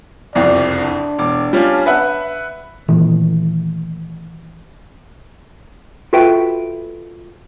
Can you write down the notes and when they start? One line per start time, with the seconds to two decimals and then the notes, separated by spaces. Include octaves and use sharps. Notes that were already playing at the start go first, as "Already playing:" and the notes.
0.35 F#1 C2 F2 D5
0.81 D4
1.19 E1 D6
1.53 G3 C#4 F4
1.86 B4 E5 F#5
2.88 A#2 D#3 E3 A3
6.13 F4 F#4 A4 B4 E5 G5